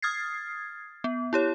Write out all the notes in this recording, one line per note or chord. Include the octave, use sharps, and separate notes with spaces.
D#6 F6 G#6 A6 C7
B3
E4 G4 C#5